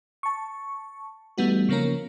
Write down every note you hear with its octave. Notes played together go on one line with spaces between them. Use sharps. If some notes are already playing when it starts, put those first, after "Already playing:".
A5 C#6
E3 G3 A3 B3 D#4 F#4
C#3 F3 A#3 C#4 A#4